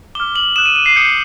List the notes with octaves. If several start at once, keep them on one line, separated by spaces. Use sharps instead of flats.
D6 F6 G7
F#7
D#6 F#6 E7
D#7
D#7
C7
D#6 G6 C#7